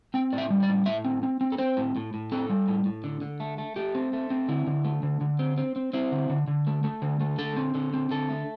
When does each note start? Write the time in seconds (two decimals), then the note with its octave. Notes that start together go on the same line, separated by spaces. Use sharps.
0.14 C4 G5
0.33 A2 D5
0.38 E5
0.50 G3
0.63 D5
0.69 A2
0.86 A2 E5
1.04 C4
1.23 C4
1.41 C4
1.52 A4
1.58 C4 C5
1.77 A2
1.96 A2
2.14 A2
2.32 C4 A4
2.50 G3
2.68 A2
2.85 A2
3.04 D3
3.21 D3
3.40 A3
3.58 A3
3.76 A3 G4
3.95 C4
4.13 A3
4.30 C4
4.48 D3 E4
4.67 D3
4.85 A3
5.03 D3
5.21 D3
5.39 C4
5.58 C4
5.76 C4
5.93 C4 E4
6.12 D3
6.29 D3
6.48 D3
6.67 A3
6.84 A3
7.02 D3
7.20 A3
7.38 D3 A4
7.56 C4
7.75 D3
7.94 C4
8.11 D3 A4
8.29 A3